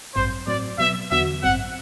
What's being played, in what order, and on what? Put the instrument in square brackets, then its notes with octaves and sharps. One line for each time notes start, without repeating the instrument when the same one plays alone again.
[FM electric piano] A1 G2 F#3 C4 [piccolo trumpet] C5
[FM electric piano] A2 F#3 C4 [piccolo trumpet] D5
[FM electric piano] B2 F#3 B3 [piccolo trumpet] E5
[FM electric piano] E2 D3 F#3 B3 F#4 [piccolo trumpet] E5
[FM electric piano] A1 G2 F#3 C4 [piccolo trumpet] F#5